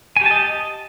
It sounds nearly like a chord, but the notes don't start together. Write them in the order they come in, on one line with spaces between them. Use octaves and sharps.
G#5 G4 A5 D#5